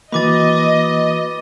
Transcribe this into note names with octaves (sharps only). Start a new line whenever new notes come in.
E3 A#3 F#4 B4 D#5 B5 D6 A6